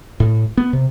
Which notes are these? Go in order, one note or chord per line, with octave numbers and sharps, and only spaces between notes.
A2
B3
C3